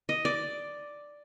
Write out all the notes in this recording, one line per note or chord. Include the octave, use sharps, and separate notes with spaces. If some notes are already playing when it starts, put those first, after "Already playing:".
D#5
D5